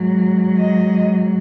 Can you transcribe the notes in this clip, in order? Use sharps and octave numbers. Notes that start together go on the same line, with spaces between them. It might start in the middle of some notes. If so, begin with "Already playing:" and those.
Already playing: G#2 F#3
D#5